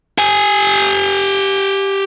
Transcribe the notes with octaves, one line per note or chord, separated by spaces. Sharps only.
G4 G#5